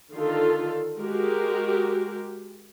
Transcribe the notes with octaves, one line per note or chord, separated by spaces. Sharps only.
D3 D#3 F4 A4
G#3 F#4 G4 A#4